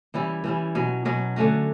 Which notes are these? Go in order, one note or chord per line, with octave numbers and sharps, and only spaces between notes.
E3 G3 C#4 E4
E3 G3 C#4 E4
B2 F#3 C#4
B2 F#3 C#4
D3 A3 C#4 F#4